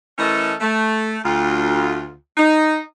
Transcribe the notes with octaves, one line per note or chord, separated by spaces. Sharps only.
E3 A3 C#4 A4 A#4 D#5
A3
D2 F4
D#4